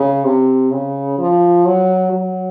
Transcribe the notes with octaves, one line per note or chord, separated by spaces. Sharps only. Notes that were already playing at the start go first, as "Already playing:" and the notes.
Already playing: C#3
C3
C#3
F3
F#3
F#3